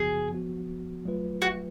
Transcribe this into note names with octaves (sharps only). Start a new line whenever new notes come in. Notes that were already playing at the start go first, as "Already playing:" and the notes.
Already playing: F#2 C#3 F3 B3 F#4 G#4
F3 B3 F#4
F#3 A3 F4 B4
F#4